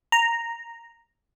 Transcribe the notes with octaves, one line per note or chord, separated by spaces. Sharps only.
A#5